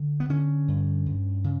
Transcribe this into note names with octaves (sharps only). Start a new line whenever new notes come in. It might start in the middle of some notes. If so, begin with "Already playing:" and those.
Already playing: D3
B3
D3 C#4
G2
G2
C#3